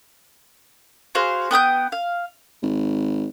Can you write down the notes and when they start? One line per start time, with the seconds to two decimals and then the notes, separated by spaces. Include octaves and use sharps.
1.15 F#4 G#4 C5 F5
1.51 B3 G5 D#6 G6
1.92 F5
2.62 G#1